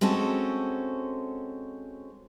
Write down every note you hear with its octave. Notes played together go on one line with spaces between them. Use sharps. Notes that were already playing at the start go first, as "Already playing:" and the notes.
G#3 C4 C#4 F#4 A4